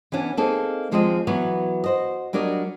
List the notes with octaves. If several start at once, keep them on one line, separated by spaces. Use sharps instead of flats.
E3 B3 C#4 D4
A#3 C4 D#4 G#4 A4
D#2 F3 G#3 C4 G#4 D#5
E3 F#3 B3 C#5
F#4 C5 D#5
F#3 G3 D4 A#4 C#5 D#5